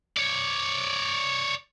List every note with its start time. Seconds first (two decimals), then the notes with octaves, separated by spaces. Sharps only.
0.17 C#5 D5